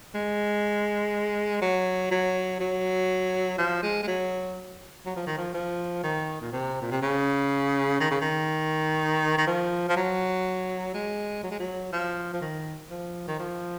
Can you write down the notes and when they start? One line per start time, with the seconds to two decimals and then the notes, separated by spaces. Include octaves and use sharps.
0.15 G#3
1.62 F#3
2.11 F#3
2.60 F#3
3.58 F3
3.83 G#3
4.03 G#3
4.07 F#3
5.06 F#3
5.16 F3
5.27 D#3
5.37 F3
5.54 F3
6.04 D#3
6.41 A#2
6.53 C3
6.81 A#2
6.91 C3
7.02 C#3
8.00 D#3
8.11 C#3
8.22 D#3
9.38 D#3
9.47 F3
9.89 F3
9.97 F#3
10.94 G#3
11.43 F#3
11.52 G#3
11.60 F#3
11.93 F3
12.33 F3
12.42 D#3
12.91 F3
13.28 D#3
13.39 F3